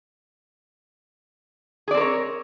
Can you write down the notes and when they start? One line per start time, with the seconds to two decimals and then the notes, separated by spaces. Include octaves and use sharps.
1.88 G#4
1.91 D5
1.94 C4
1.97 A#4
2.01 C#5